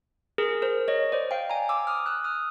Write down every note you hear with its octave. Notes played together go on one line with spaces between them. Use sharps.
G#4 A#4
A#4 C5
C#5 D#5
C5 D5
F5 G5
G#5 A#5
D6 E6
D#6 F6
E6 F#6
D#6 F6